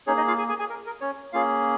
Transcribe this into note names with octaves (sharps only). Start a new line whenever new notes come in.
A#3 C#4 D#4 G#4 C#5
D#4 D#5
F4 F5
G#4 G#5
G#4 G#5
G#4 G#5
A#4
A#4
C#4 C#5
A#3 C#4 F4 G#4 F5